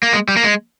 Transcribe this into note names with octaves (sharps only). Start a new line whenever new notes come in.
A#3
G#3
G3
A#3
G#3